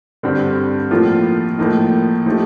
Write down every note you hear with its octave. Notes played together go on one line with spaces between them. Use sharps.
G2 D3 G3 C4
A2 F3 A#3 F4
A2 F3 A#3 D#4
F3 A3 D#4 G4